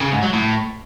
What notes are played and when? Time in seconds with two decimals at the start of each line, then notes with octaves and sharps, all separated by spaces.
0.01 C#3
0.12 G#2
0.22 F#3
0.33 A2